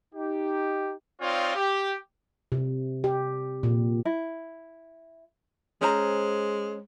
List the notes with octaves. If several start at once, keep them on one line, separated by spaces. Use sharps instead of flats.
D#4 G4
C4 D#4 F4 C#5 D5 F5
G4
C3
G4
A#2
E4
G#3 C#4 C5 A#5